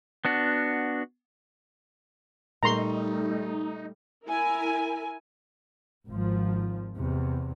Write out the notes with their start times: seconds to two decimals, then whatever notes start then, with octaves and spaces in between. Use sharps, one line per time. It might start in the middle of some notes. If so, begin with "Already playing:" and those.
0.25 B3 D4 F#4
2.63 A#2 G3 A3 D#4 A#4 A#5 C6 C#6
4.28 E4 A#4 G#5
6.08 G#1 F3
6.97 E2 C3